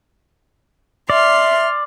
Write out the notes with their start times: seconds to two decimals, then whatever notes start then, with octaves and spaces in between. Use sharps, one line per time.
1.10 D5 E5 C6 F6